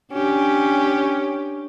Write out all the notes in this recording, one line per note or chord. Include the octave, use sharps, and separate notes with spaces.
C#4 D4 G4